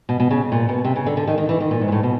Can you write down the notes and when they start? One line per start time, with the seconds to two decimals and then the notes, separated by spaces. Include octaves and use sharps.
0.09 B2
0.20 B2
0.31 C#3
0.52 A#2
0.69 B2
0.84 C3
0.96 C#3
1.06 D3
1.17 D3
1.27 D#3
1.38 D#3
1.49 E3
1.61 D#3
1.71 A#2
1.81 G#2
1.88 A#2
1.92 A2
2.03 B2